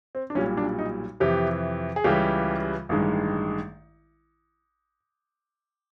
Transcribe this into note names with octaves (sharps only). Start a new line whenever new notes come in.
C4
D4
B1 A#2 G3 C#4
D4
D#4
F2 C3 E3 G4
G#4
C#2 C#3 E3 G3 G4
A1 G2 D#3 G#3